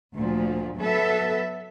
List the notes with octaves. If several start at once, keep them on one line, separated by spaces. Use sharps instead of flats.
D2 A#2 F3
F#3 B3 A4 B4 E5